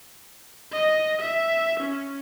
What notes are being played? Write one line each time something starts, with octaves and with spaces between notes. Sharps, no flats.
D#5
E5
C#4